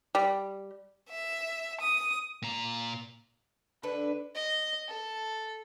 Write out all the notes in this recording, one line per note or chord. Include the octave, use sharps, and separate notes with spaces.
G3
E5
D#6
A#2 A#5
D3 D4 A4 B4
D#5
A4